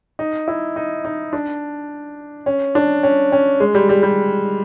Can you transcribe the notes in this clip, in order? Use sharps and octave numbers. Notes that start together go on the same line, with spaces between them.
D#4
E4
D#4
D#4
D4
C#4
D4
C#4
C#4
G#3
G3
G3
G3